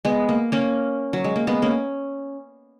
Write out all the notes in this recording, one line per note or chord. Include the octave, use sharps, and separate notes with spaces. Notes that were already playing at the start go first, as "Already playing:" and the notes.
G#3 B3
A#3
A#3 C#4
F#3
G#3
A#3
G#3 B3
A#3 C#4